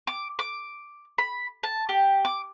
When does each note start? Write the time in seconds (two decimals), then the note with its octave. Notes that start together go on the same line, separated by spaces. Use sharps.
0.07 D6
0.39 D6
1.18 B5
1.63 A5
1.89 G4
2.25 D6